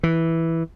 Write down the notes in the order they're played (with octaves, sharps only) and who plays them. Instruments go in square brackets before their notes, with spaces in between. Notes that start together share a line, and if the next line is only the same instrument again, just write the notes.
[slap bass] E3